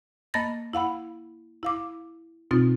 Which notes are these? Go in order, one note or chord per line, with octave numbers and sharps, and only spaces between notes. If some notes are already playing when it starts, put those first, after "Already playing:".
A#3 D#5 A5 B5 A6 A#6
E4 F5 F#5 B5
E4 F5 D6
B2 C4 D#4 F4 A6